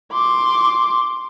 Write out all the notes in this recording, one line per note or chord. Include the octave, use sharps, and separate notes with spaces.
C6 D6